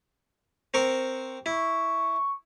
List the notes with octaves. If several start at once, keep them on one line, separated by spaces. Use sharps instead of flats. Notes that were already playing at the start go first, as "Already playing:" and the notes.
C4 A#4 C#6
E4 C#6